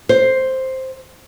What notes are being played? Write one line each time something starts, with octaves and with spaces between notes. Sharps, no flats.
C5